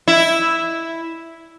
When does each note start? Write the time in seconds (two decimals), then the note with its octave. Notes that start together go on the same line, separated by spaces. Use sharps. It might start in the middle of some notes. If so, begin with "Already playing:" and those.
0.08 E4